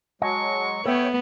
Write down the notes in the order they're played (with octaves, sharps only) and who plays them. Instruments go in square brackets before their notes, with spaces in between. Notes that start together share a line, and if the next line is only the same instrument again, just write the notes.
[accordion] F#3 G#3 [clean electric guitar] D#5 G#5 A5 [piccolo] C#6
[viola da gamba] B3 [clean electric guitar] A4 E5 [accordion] C#5 G5